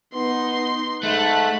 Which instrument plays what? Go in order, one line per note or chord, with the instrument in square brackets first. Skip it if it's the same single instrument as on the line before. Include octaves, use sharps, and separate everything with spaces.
[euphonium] B3 [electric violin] D#4 C6
[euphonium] G#2 [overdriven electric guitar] A3 [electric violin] B5 F#6